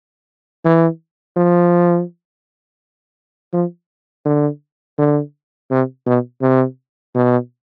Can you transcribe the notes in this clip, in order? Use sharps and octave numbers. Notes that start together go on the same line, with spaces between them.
E3
F3
F3
D3
D3
C3
B2
C3
B2